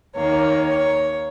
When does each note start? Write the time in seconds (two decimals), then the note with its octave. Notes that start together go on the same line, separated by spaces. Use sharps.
0.15 D#2 D#3 A#3 C#5
0.67 C#5